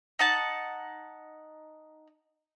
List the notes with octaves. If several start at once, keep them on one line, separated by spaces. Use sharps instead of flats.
D#4 F#5 A5